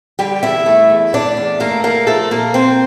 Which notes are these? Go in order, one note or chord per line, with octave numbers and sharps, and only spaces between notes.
D3 G3 G4
E2 E4 E5
A3
E2
A3 D4 D5
E2
A3 A#3 A#4
A3 A#3 A#4
F3 A3 A4
A#2 A#3 A#4
A#2 C4 C5